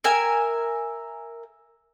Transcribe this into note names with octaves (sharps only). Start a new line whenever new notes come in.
A#4 E5 G#5